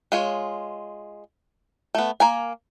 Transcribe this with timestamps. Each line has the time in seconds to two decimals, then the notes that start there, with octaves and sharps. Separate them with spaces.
0.12 G#3 F4 C#5
1.95 A3 B3
2.20 A#3 A#4 G#5